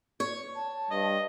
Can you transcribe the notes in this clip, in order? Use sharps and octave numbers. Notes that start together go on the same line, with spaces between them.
C#5
A5
G2 D#5